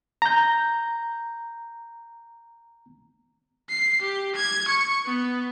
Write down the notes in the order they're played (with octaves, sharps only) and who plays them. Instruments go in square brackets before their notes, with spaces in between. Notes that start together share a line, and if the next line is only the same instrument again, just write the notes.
[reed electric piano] A#5 G6
[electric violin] C7
G4
G#6
C#6
B3